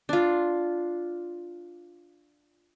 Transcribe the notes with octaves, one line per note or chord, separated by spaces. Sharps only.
D4 F4